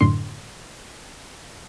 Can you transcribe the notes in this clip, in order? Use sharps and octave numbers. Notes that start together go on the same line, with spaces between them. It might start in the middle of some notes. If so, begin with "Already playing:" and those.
F#2 A2 D3 C6